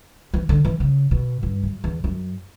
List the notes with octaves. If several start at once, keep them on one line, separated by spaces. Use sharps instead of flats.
E3
D3
E3
C#3
B2
G2
F#2
E2
F#2